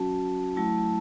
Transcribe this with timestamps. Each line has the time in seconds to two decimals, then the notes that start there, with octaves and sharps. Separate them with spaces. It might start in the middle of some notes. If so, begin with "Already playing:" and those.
Already playing: F#3 C#4 F#4 A5
0.56 F#3 A3 E4 A5